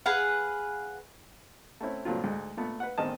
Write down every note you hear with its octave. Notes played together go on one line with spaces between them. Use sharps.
G#4 B4 F5 F#5
A3 C4 C#4 E4
G2 A#2 D3 F#3 C4 F4
D2 G#2
A#2 A3 B3
B4 F#5
A1 E2 D#3 C4 D#5 A5